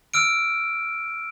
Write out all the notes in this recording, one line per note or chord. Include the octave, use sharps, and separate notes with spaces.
E6 F6 D7